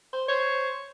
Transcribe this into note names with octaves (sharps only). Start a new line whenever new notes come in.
C5
C5 C#5